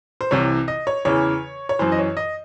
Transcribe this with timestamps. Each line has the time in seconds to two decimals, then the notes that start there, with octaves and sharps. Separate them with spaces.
0.21 C5
0.31 C2 C3 E3 C#5
0.68 D#5
0.87 C#5
1.05 E2 C#3 E3 C#5
1.69 C#5
1.79 F#2 E3 C5
1.92 D#5
1.99 C#5
2.17 D#5